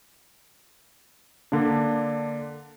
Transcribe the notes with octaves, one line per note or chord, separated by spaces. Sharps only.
D3 A#3 D4